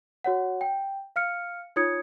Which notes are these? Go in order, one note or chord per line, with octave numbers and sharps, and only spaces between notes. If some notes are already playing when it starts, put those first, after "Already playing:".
F#4 C#5 F#5
G5
F5 F6 C#7
D#4 F4 C#5 D#6 G#6 C#7